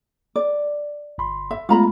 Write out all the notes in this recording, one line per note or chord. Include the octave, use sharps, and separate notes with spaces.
D5
G1 B5 C6
E5
G#3 A3 B3 F4 A#5 B5